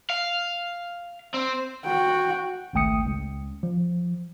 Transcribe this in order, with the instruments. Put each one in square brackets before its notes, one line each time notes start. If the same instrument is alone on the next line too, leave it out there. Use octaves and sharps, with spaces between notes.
[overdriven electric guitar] F5
C4
[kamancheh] F#4 [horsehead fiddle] G5
[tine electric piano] G#1 C#2 A3 G5 D#6 C#7
C#2
F3